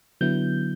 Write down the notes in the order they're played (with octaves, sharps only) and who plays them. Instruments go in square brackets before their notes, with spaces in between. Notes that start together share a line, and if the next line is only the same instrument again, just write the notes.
[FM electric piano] D3 F#3 B3 E4 G6